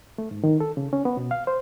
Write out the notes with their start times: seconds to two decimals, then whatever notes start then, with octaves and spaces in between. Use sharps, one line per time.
0.18 A3
0.31 G#2
0.44 D#3
0.60 A4
0.77 C#3
0.93 C#4
1.05 B3
1.17 B2
1.31 F5
1.47 C5